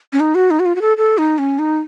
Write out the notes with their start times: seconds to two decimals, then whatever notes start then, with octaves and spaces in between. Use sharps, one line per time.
0.13 C#4
0.20 D#4
0.35 F#4
0.51 D#4
0.60 F#4
0.66 F4
0.75 F#4
0.81 A4
0.97 A4
1.18 D#4
1.38 C#4
1.59 D#4